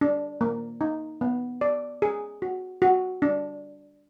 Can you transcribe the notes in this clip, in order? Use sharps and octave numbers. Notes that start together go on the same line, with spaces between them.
D4
A#3
D#4
B3
D5
G#4
F#4
F#4
D4